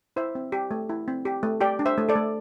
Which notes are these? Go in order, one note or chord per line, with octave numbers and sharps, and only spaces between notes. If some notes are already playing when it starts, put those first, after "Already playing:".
E4 C5 E5
C4
G4
A3
E4
C4
G4
A3
G4 D5 G5
D4
C5 E5
A3
A4 D5
A3